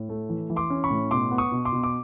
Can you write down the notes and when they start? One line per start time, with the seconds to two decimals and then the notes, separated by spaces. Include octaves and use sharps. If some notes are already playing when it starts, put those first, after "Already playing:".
Already playing: A2
0.09 A3
0.29 E3
0.50 E3
0.56 C6 D6
0.70 C#4
0.84 B5 C#6
0.90 A2
1.11 B2 C6 D6
1.31 B3
1.38 C#6 D#6
1.52 B2
1.65 C6 D6
1.73 B2
1.83 D6